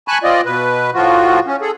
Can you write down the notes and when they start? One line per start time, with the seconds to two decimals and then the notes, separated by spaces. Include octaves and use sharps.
0.08 G#5 A5 B5 C#6 F#6
0.23 C4 F4 D5 D#5
0.46 B2 B4
0.94 A2 F3 F4 F#4
1.47 C#4
1.62 G#4 A4